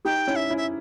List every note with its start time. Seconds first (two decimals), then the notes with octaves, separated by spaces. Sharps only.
0.05 D#4 G4 G5
0.27 C#4 E4
0.36 E5
0.50 C#4 E4
0.57 E5